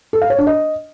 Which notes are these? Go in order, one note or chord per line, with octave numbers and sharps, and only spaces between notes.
A4
F5
C#5
D4
D#5